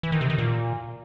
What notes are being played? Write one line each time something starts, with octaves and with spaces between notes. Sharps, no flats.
E3
D#3
C3
D#3
A#2